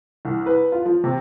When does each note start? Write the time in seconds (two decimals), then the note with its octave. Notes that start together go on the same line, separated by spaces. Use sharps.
0.25 C2
0.46 B4
0.72 F4
0.86 F3
1.04 C3